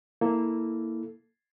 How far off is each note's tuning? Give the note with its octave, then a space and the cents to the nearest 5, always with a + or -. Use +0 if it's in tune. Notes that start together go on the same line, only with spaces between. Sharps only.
A#3 -5 E4 -15 A4 +0